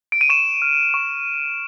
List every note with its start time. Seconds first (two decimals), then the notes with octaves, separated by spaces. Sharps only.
0.12 D7
0.21 D#7
0.29 C#6 E7
0.62 F6
0.94 C#6